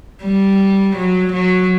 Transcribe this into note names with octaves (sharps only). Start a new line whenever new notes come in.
G3
F#3
F#3